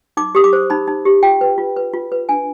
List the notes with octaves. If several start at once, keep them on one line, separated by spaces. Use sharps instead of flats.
D#4 D6
G4 D#6
D6
C5
D#4 B5
D#4
G4
F4 G5
B4
F4
B4
F4
B4
D4 G#5